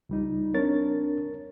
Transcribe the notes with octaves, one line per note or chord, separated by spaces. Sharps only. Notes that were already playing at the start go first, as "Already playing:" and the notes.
C#2 G3 D#4
C4 D4 A#4 C#5 A6